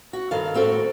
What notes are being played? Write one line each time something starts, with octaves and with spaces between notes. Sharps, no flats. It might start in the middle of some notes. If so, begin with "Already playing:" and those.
F#4
G2 D#3 A4 F5
A2 C4 F#4 A4